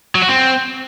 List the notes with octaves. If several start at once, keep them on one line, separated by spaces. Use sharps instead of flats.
F#3
F#4
C4